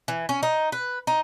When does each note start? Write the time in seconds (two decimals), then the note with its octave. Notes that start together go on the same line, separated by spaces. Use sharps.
0.08 E3
0.29 C#4
0.43 D#4
0.72 B4
1.07 D#4